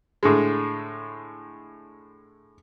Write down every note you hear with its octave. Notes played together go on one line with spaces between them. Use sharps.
A2 D3 G#3